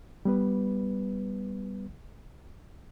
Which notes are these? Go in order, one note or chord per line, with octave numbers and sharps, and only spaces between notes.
G3 B3 B4